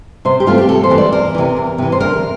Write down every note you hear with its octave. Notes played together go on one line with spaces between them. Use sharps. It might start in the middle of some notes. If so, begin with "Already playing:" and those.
C3 C5
G4
E3 A3 C4 F4
G4
C3 A4
C5
E3 A3 C4
D5
E2 A#4
C3 E3
E2
C3 E3
C5
D2 A#4